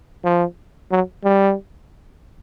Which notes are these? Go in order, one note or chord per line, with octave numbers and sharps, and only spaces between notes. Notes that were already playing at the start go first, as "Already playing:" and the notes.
F3
F#3
G3